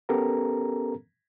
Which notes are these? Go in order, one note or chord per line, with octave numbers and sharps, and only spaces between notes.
B3 C#4 G4 A4 A#4 A#5